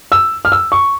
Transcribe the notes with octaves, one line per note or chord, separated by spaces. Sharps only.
E6
F6
E6
C#6